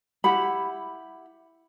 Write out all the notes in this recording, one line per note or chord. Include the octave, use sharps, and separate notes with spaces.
E4 G4 F#5 B5